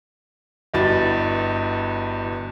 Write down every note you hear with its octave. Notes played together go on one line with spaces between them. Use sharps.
G1 G2 E4 F#4 D#5 A6